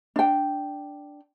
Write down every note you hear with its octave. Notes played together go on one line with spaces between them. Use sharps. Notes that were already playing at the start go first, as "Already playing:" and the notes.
D4 G5